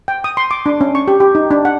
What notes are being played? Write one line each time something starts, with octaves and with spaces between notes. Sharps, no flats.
G5
D#6
C6
D6
D4
C#4
C#6
G4
G4
D#4
D4
F#5